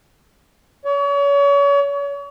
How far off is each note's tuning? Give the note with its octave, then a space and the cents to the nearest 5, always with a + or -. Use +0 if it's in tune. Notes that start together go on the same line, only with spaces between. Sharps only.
C#5 +35